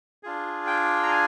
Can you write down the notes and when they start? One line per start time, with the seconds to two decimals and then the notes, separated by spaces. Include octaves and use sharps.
0.23 D4 F4 G#4
0.67 G5
1.03 A#5
1.12 G#5